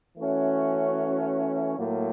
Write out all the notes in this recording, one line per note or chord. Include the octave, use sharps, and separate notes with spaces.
E3 A3 C#4 F#4
A2 F#3 A#3